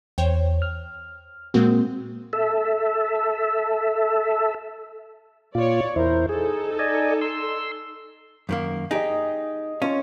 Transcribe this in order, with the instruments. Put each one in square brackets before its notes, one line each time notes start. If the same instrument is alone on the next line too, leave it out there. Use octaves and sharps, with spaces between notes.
[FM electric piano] E2 [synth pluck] C5 C#5 G5
[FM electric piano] F6
[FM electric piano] A#2 A#3 F#4 [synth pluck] G#3 C4
[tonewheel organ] A4 E5
[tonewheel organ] A#2 F4 [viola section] C#5 D5
[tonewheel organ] E2 E4 C5 [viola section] A#4
[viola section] D#4 A4 [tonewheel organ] G#4
[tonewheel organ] D5 D#5 G#5
C6 E6
[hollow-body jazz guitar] F#2 D#3 A#3
[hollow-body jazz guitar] D#4 G4 [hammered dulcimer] G#4 D#5
[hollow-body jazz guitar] C#4 [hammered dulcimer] F4 C#5